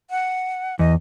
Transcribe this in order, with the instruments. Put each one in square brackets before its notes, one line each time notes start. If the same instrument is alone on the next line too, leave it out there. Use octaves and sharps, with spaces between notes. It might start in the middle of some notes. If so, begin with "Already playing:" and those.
[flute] F#5
[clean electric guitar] E2 [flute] D#5